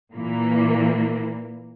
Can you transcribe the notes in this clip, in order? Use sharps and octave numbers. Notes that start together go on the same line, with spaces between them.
A#2 E3 A#3